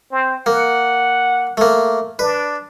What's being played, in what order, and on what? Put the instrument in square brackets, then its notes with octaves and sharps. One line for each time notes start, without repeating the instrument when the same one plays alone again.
[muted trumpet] C4
[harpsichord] A#3 [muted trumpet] F#5
[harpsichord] A3 A#3
[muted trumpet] D4 [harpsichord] B4